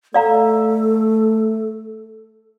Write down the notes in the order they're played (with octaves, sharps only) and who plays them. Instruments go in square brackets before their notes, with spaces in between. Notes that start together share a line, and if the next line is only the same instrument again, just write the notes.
[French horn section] A3 [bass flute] A4 [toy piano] D5 F5 A#5